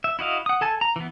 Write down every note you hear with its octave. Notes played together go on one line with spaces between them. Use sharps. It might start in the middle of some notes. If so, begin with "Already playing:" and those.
E5
E4 F#4 D#5 F5
F#5 D#6
A4 G#5 A5
A#5
E3 B3